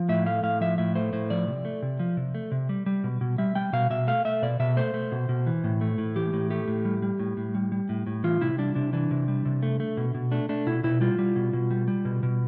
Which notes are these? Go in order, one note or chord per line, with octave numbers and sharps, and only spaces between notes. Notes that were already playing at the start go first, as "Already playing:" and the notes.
Already playing: F3
A2 E5
A3 F5
A2 F5
F3 E5
A2 E5
A3 C5
A2 C5
F3 D5
C3
A3
C3
F3
C3
A3
C3
G3
G3
B2
B2
G3 E5
G3 G5
B2 F5
B2 E5
A3 F5
A3 E5
B2 D5
B2 E5
A3 C5
A3
B2
B2
E3
A2
A3
A2
E3 G4
A2
A3 G4
A2
G3
G3
A2
A2
G3
G3
A2
A2
E3 F4
C3 E4
G3 D4
C3 D4
E3 D4
C3
G3
C3
A3
A3
B2
B2
A3 D4
A3 D4
B2 E4
B2 E4
G3 F4
G3
B2
B2
G3
G3
B2
B2